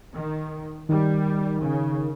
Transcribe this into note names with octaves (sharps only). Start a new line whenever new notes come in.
D#3
D#3 G3
C#3